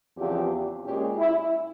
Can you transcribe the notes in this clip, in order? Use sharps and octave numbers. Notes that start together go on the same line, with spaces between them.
E2 C#3 F3 C4 G4
A#2 G#3 C#4 G4
E4